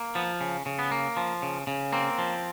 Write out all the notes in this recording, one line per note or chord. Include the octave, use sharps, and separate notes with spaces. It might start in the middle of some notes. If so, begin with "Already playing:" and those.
Already playing: A#3
F3 B3
C#3
C#3
B3
A#3
F3
C#3
C#3
A#3 C4
F3